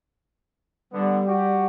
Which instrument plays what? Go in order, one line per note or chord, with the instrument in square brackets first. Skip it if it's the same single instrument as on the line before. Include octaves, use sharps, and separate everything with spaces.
[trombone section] D3 B3 [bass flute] G3
[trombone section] F#4 G4